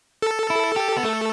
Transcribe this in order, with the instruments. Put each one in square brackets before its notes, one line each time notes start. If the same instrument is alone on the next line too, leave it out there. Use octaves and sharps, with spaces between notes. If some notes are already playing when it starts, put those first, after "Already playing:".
[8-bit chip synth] A4
[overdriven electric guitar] E4
G4
B3
A3